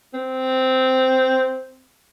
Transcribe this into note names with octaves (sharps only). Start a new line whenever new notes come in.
C4